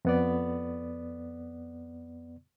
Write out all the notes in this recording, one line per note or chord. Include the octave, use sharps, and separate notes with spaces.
F2 B3 D5